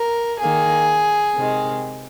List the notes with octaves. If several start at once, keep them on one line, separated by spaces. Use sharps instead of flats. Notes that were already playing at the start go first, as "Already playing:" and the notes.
Already playing: A#4
D#3 A#3 G#4
C3 D#3 G#3